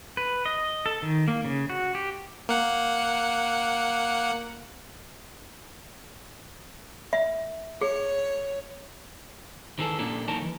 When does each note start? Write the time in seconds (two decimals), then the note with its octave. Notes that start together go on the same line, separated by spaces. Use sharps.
0.17 B4
0.46 D#5
0.86 A4
1.02 D#3
1.28 A#3
1.45 C#3
1.70 F#4
1.95 G4
2.49 A#3 F#5
7.13 E5
7.81 G#4 C#5
9.79 D#3 E3 G#4 A4
9.99 A#2 G3 A#3 C#4 D4 A4
10.28 B1 E3 D#4 A#4 C#5 A5
10.42 D#3 E3